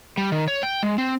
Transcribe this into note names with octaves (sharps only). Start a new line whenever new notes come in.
G3
D#3
C#5
G5
G#3
C4